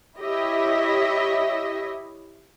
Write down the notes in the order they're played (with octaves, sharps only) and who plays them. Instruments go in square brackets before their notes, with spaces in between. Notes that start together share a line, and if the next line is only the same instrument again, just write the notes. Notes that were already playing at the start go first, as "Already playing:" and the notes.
[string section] E4 G4 C#5 D#5 E5